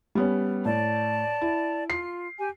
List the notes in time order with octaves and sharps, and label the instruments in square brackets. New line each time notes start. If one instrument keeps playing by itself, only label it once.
[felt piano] G3 B3 C#4
[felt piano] A2 [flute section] D5 A5
[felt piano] E4
[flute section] F4 [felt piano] C7
[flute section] G4 G#5